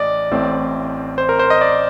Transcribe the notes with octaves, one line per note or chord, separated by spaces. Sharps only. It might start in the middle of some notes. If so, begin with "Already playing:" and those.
Already playing: A1 D5 D#5
A1 A2 A3 C4
C5
A#4
C5
D#5
D5